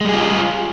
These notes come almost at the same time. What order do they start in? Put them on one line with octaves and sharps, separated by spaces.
G#3 G3 G#4 F4